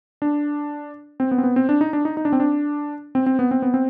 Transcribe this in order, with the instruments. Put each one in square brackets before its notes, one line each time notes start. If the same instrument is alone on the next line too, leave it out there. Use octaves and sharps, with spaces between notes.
[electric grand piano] D4
C4
B3
C4
B3
C4
D4
D#4
D4
D#4
D#4
D4
C4
D4
C4
C4
B3
C4
B3
C4